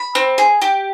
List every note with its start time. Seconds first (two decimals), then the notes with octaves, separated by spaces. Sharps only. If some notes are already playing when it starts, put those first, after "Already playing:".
Already playing: B5
0.15 C4
0.38 G#4
0.62 G4